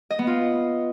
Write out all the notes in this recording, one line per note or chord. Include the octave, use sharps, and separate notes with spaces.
D#5
B3
F4